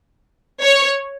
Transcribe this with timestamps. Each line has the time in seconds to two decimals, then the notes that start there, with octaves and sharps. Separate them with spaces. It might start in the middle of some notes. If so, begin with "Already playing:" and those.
0.62 C#5